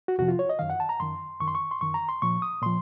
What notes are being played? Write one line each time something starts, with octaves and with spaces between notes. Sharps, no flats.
F#4
F2 C3 F3 F#4
F4
C#5
D#5
F#2 D#3 F5
F#5
A5
A#5
F#2 D#3 C6
F#2 D#3 C#6
C6
C#6
C6
F#2 D#3 C#6
A#5
C6
A#2 F3 C#6
D#6
A#2 F3 C6